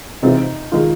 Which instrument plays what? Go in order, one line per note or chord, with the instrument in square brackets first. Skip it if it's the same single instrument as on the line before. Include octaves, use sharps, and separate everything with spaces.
[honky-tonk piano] C3 E3 G#3 C4 F4 [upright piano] D#4
[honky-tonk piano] D#3 G#3 [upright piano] D#4 F4